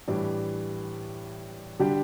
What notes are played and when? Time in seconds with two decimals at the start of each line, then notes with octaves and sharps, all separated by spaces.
0.08 A2 E3 G3 D4
1.79 D3 G3 D4 G4